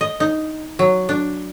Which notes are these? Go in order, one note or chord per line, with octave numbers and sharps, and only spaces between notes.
D#5
D#4
F#3
D4